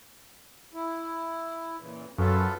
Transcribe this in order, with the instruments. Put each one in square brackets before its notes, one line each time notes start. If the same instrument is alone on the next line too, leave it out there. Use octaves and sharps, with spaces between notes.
[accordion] E4
A#2 C#3 E3
[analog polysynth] F#2 [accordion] F4 A4 B4